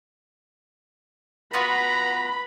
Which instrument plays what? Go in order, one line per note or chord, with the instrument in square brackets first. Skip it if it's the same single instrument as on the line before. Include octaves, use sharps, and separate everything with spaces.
[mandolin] B3 F4 F#4 [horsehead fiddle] B4 [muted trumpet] A#5 [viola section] B5